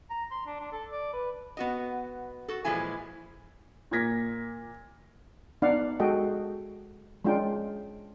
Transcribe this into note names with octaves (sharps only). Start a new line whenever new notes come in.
A#5
C6
D4
D4
A4
D5
B4
B3 F#4 D#5
F#4 A4
A#2 E3 F3 G#3 E4 G#5
A#2 A#3 G#6 A#6 B6
B3 D4 D#4 D5 F5 F#5
G#3 F#4 A4 D#5 G5
G#3 C#4 D4 F4 G5